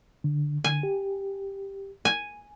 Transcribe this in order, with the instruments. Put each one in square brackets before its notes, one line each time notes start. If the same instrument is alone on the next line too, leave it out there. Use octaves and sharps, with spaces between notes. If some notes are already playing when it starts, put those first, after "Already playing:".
[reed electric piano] D3
[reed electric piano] D3 [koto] G#5
[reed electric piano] G4
[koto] G#5